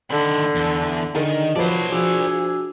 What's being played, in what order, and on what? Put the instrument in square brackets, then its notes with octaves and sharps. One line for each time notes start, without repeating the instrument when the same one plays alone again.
[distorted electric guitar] D#2 B5 [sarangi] D3
[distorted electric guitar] E2
[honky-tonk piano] D3 G#4 A#4 [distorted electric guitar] D#3 [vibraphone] D#5
[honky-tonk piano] F3 B4 [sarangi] F#3 [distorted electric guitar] C5 D5 [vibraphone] A5
[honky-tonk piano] F3 [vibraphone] D4 F#4 E6 [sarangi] G#4